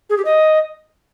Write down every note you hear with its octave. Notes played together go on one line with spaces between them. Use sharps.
G#4
G4
D#5